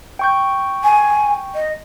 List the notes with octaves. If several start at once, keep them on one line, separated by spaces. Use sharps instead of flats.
G5 C#6 G6
G#5
D#5